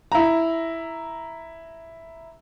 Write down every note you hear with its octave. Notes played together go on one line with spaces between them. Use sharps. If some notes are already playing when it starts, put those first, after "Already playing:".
E4 A#5